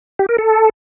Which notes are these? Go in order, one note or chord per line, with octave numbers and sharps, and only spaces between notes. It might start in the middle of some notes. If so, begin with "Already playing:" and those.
G4
A#4
A4